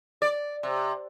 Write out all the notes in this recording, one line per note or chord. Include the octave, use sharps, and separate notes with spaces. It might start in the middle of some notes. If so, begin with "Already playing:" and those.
D5
C3